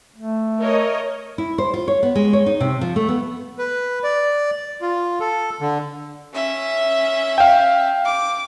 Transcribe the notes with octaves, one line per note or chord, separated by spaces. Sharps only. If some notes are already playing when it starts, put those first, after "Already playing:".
A3
A#4 C#5 D#5
E4
C5
F4
C#5
B3
G#3
C#5
D#4
C3
F3
A3
B3
B4
D5
F4
A4
D3
C#4 E5
F5 G5
D6